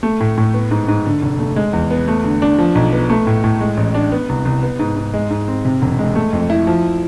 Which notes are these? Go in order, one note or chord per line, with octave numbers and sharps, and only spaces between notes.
A3
A2
A2
B3
G#2
G#2
D3
F1
A3
G#3
E2
B3
A3
D3
D4
F3
B1
B3
A3
A2
A2
G#3
A1
D4
B3
C2
C2
B3
G#2
G#2
G#3
G#2
C4
C3
E1
G#3
A3
F2
E4
F3